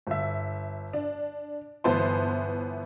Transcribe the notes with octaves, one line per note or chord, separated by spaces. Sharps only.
G1 E5
D4
G1 E3 B3 C5 A5 C6